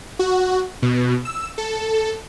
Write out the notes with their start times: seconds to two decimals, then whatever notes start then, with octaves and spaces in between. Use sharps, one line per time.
0.19 F#4
0.82 B2
1.25 E6
1.58 A4